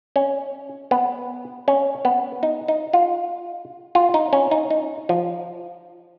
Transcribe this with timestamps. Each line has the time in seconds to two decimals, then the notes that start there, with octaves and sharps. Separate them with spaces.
0.16 C#4
0.91 B3
1.68 C#4
2.05 B3
2.43 D#4
2.68 D#4
2.93 F4
3.95 F4
4.14 D#4
4.33 C#4
4.51 D#4
4.71 D#4
5.09 F3